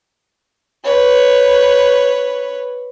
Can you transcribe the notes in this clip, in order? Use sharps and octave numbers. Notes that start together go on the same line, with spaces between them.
B4 C#5